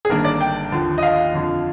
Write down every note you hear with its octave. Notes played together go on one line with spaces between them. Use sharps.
G#4
G1 G2 D#3 A#3 D4 A#4
D5
G5
D#2 D3 F3
D#5
F5
F2 D3 F3